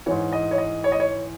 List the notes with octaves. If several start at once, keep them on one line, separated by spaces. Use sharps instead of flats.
G#2 E3 C#5
D#5
C#5
D#5
C#5
D#5
C#5